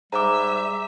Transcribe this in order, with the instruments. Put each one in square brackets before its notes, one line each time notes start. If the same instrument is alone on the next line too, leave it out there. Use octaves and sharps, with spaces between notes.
[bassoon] G#2 [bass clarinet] G3 [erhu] E5 [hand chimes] A#5 D6